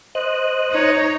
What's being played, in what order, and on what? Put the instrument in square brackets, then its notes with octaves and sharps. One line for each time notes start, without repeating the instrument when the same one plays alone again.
[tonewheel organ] C5 D#5 F#6
[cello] D#4 C#5